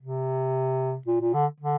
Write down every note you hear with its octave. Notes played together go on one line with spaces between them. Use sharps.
C3
A#2
A#2
D3
D3